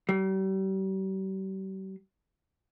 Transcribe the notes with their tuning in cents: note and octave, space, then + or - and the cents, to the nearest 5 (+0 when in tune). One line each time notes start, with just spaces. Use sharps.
G3 -40